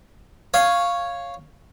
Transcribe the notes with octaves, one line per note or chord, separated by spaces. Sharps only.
C#5 F5